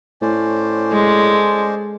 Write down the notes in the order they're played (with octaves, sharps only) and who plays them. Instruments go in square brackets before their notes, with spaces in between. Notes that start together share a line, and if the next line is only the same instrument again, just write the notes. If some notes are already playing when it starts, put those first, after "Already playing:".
[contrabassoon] A2 [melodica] C#4 C5 D5
[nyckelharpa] G#3 A4